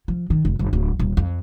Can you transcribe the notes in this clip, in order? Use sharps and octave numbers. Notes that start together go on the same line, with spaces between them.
F3
D#3
F1
G1
D1
D#1
F2